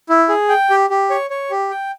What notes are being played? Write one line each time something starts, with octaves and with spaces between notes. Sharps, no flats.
E4
G#4
G5
G4
G4
C#5
C#5
G4
G5